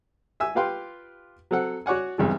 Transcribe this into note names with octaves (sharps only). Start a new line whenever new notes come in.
E5 G#5 E6
F4 G4 B4 F5 G5 C6
F#3 C4 A4 F#5
F#4 C#5 D5 F#5 G#5
B1 E2 G2 C3 G#3